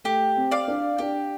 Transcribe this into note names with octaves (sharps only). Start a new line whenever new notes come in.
A3 G4
C4
D5 F5
D4
D4 G4